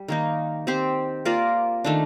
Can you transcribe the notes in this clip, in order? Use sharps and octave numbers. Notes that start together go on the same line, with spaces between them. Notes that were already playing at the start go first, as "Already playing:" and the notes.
Already playing: G3
D#3 A#3 D#4
C4 G4 C5
A#3 F4 A#4 D5
D#3 A3 D4